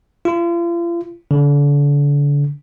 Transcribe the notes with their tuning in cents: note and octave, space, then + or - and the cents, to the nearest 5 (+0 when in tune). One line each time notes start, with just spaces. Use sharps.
F4 -40
D3 -35